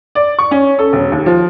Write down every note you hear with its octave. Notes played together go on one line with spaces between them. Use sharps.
D5
C#6
C#4
A4
E1
D#2
F3